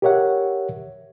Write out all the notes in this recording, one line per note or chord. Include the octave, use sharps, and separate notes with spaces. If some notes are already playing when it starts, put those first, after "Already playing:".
G4 A#4 C#5 E5 F#5